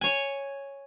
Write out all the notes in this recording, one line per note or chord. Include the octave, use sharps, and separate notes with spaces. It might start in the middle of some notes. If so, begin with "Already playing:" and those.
C#5 G#5